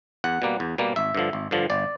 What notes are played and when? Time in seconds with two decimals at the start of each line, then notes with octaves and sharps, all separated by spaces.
0.24 E2 F#5
0.42 B2 G3 A#3
0.60 E2
0.78 B2 G3 A#3
0.96 G#1 E5
1.15 G2 D3 F3
1.33 G#1
1.51 G2 D3 F3
1.70 G1 D5